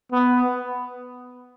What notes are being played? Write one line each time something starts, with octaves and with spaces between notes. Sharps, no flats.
B3